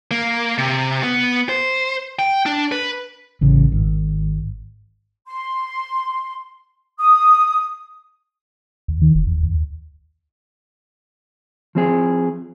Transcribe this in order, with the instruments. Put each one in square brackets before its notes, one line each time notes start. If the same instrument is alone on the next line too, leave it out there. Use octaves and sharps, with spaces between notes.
[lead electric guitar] A#3
C3
B3
C5
G5
D4
B4
[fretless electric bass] A1 C#3
G#1
[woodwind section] C6
D#6
[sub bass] D#2
D#3
F1
E2
D#2
[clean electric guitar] F3 C4 G#4